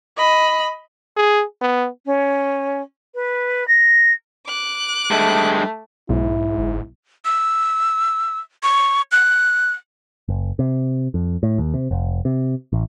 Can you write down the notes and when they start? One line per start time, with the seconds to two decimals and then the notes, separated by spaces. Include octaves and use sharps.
0.17 D#5 B5
1.17 G#4
1.61 B3
2.05 C#4
3.14 B4
3.67 A#6
4.47 D6 F#6
5.11 G2 G#3 A3
6.09 B1 G#2 E4
6.58 G1
7.25 E6
8.63 C#6
9.12 F#6
10.28 F#1
10.59 C3
11.14 F2
11.43 A2
11.58 D#2
11.74 C3
11.91 F1
12.25 C3
12.73 A1